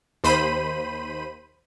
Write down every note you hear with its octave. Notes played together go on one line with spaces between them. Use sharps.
D#2 C5 B5 D#7